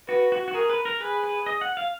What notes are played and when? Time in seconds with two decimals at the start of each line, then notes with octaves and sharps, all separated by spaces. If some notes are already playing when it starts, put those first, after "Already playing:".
0.08 F#4 B4
0.32 F#4
0.48 F#4
0.54 G#4 A#4
0.70 B4
0.85 A#4
1.00 G#4 B4
1.24 B4
1.46 D#5
1.61 F#5
1.77 F5